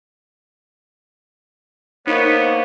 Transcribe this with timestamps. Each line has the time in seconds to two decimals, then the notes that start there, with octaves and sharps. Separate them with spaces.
2.07 A#3 B3 D#4 C5 C#5